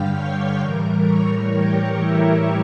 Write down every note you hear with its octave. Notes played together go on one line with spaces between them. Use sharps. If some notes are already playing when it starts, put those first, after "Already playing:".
Already playing: G2 D3 G3 F5 G5 F6 G6
C#5 C#6
A2 E3 G3 A#4 A#5
C#5 C#6
G4 G5
E4 E5